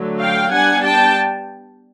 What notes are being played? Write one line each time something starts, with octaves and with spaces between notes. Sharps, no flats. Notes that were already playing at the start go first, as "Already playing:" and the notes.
Already playing: D3 F#3 A3
F5 G5
G3 B3 D4 F#5 G#5
G5 A5